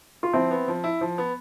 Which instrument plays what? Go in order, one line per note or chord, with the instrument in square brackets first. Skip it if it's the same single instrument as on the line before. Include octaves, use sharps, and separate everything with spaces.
[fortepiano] F4
[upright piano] F3 [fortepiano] C4 E4
[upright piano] B3
F3
E4
F3
B3